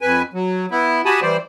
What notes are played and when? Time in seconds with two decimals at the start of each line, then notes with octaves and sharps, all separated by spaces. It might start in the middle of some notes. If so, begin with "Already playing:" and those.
0.01 F2 B4 G#5
0.33 F#3
0.71 B3 E4
1.05 F#4 G4 G#5 A5 B5 D#6
1.22 E3 G3 C5 D5